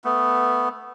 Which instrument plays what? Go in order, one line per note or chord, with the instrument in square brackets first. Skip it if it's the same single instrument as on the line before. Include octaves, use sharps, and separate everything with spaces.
[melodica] A3 B3